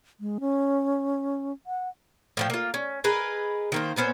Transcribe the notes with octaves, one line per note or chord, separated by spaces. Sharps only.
G#3
C#4
F#5
A2 F3 G5
A#3 F4
C#4
G#4 A#4 B4 D#5
D#3 A#3 C5
A#2 B3 C#4 C5